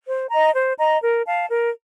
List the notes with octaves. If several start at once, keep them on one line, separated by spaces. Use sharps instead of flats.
C5
D#5 A#5
C5
D#5 A#5
A#4
F5 A5
A#4